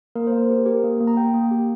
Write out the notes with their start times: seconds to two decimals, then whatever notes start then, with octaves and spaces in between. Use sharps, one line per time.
0.15 A#3 A#4
0.27 A#3 C5
0.38 A#4
0.50 G4
0.66 G4 A#4
0.84 A#3
1.00 A#3
1.07 A#5
1.17 A#3 G5
1.34 A#3
1.51 G4